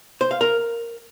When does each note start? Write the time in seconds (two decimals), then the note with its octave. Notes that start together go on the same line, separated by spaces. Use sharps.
0.21 C5
0.31 F5
0.41 A#4